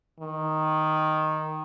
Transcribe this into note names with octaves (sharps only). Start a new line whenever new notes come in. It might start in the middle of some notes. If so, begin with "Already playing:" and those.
D#3